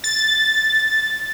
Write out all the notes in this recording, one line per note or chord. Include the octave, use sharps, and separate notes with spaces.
A6